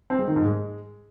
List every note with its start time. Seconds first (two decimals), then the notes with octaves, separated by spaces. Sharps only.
0.10 C4
0.19 G#3
0.27 D#3
0.36 G#2
0.45 G#3